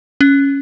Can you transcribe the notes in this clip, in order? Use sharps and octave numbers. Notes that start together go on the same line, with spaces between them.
C#4